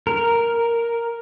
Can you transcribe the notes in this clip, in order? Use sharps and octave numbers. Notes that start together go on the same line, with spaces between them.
A#4